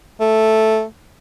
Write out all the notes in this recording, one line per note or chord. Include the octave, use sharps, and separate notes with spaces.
A3